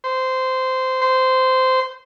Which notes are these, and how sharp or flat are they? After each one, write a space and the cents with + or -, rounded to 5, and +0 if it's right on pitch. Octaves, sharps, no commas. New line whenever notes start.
C5 -15
C5 -15